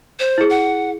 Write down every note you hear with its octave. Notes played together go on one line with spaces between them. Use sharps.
C5
E4 G#4
F#5